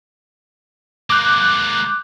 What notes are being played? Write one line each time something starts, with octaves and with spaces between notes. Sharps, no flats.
G#3 A#3 D6 F#6 G6